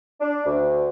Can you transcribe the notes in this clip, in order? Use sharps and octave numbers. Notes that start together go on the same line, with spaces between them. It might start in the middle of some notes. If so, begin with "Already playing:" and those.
D4
D2